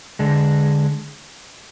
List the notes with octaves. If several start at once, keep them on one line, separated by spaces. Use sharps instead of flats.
D3 G#3 D4